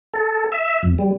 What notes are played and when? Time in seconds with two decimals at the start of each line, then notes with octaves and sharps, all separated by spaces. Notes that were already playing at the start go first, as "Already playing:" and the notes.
0.14 A4
0.52 E5
0.83 F2
0.98 G3